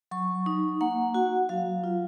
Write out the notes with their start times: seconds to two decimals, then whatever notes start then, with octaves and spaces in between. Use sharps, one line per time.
0.11 F#3 C#6
0.46 D#4
0.81 A#3 F#5
1.14 F#4
1.49 F#3 F5
1.84 F4